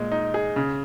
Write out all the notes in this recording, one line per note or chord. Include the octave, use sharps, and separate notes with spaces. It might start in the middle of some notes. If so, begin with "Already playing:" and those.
Already playing: A#2 G#3
D#4
G#4
C#3